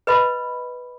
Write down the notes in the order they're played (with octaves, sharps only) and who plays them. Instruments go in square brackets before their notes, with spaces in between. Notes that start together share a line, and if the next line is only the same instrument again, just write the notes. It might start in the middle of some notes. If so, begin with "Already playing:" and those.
[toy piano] B4 D#5 B5